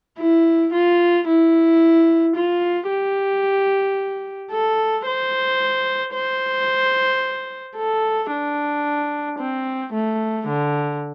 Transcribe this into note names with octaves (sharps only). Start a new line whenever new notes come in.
E4
F4
E4
F4
G4
A4
C5
C5
A4
D4
C4
A3
D3